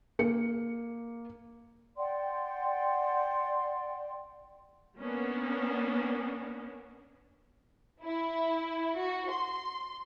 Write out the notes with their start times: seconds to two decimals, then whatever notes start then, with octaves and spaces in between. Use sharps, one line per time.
0.19 A#3 C#7
1.97 D5 F#5 G5 C6
4.99 A#3 B3 C#4 D4
8.03 E4
8.99 F#4
9.29 C6